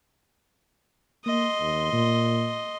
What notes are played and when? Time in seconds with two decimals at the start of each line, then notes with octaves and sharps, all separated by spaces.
1.26 A#3 D#5 C6
1.60 D#2
1.92 A#2